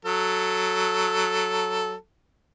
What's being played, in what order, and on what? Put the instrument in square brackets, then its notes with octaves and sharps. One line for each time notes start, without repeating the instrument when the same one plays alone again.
[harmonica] F#3 A4